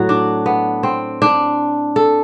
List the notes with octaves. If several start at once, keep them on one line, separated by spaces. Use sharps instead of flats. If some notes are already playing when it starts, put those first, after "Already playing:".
Already playing: A2 F#3 F#4
D4
B3
C4
D4
A4